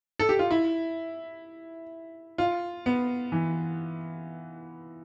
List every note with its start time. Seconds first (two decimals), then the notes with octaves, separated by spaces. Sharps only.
0.19 A4
0.29 G4
0.39 F4
0.51 E4
2.38 F4
2.86 B3
3.32 E3